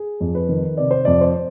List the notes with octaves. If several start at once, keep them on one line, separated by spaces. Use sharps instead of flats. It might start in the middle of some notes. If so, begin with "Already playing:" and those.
Already playing: G#4
F2
B4
D#3
C3 D5
C5
F2 D5
C5